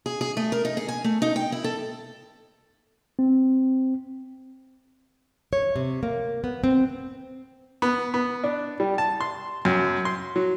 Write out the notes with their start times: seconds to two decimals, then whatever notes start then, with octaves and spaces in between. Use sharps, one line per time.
0.06 G#4
0.21 G#4
0.37 A3
0.52 A#4
0.65 D#4
0.77 G#4
0.88 G#5
1.04 A3
1.22 D#4
1.36 G5
1.52 E4
1.64 A4
3.19 C4
5.53 C#5
5.76 C3
6.03 A#3
6.44 B3
6.64 C4
7.82 B3
8.14 B3
8.44 D4
8.80 G3
8.98 A5
9.21 C6
9.65 F#2
10.05 C6
10.36 F#3